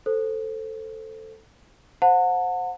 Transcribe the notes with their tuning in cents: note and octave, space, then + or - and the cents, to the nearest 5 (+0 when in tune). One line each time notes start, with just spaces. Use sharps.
A4 +10 C5 +0
C5 +0 F#5 -30 A5 +40